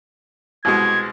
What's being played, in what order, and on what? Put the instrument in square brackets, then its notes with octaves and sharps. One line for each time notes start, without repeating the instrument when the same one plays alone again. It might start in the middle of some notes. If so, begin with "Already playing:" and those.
[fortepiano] C2 B2 G#3 [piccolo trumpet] G#6